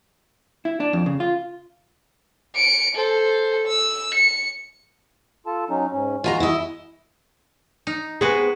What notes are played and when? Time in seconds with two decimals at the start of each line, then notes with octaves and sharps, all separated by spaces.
0.65 E4
0.80 D4
0.93 F2
1.06 C#3
1.20 F4
2.55 C#7 D7
2.96 A4 C5
3.68 E6
4.15 C#7
5.46 F4 A4 A5
5.70 F#3 C#4 D#4
5.92 G#2 C#4
6.24 G#3 F4 F#4 G#5 A#5
6.40 E4 D#5
7.87 D#4
8.21 G#3 B3 C4 F#4 G#4 B4